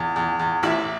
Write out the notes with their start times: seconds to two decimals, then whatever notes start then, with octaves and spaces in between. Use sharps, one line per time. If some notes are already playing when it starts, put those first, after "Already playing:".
Already playing: E2
0.16 E2
0.39 E2
0.63 A1 E4